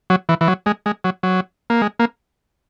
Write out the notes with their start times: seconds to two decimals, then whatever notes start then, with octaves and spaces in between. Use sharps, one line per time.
0.10 F#3
0.29 E3
0.41 E3
0.48 F#3
0.66 G#3
0.86 G#3
1.04 F#3
1.23 F#3
1.70 A#3
1.82 G#3
1.99 A#3